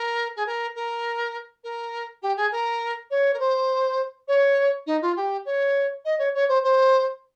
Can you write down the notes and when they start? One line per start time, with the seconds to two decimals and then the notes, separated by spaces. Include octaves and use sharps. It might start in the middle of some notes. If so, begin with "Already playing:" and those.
Already playing: A#4
0.36 G#4
0.46 A#4
0.75 A#4
1.64 A#4
2.22 G4
2.36 G#4
2.51 A#4
3.10 C#5
3.33 A#4
3.39 C5
4.28 C#5
4.86 D#4
5.02 F4
5.16 G4
5.45 C#5
6.05 D#5
6.18 C#5
6.34 C#5
6.48 C5
6.63 C5